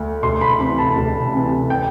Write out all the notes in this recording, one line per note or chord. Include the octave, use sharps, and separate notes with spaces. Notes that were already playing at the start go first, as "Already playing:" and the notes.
Already playing: D2
D2 C6
B5
C3 E3 B5
A5
D2
C3 E3
G5